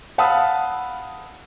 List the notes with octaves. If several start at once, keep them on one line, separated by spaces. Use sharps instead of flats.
F5 F#5 A5 B5 D#6 E6